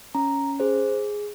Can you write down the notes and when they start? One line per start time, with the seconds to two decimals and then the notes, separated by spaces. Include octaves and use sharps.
0.15 C#4 A#5
0.60 G#4 C5